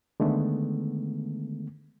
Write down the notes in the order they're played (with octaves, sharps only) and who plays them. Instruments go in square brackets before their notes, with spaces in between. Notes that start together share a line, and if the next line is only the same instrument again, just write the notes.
[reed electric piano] D3 D#3 G#3 A3 B3